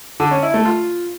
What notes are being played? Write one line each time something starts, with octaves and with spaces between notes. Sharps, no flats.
D3
C#4
E4
A3
F4